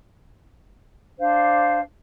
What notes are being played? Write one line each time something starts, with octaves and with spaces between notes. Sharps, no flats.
D4 C5 F5